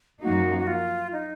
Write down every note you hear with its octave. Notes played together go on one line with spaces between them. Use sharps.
F#2 F3 A#3 D#4 F#4
F#4
F4
D#4